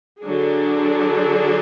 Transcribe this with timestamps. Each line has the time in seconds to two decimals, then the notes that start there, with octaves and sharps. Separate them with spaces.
0.22 D3 F#3 D4 G#4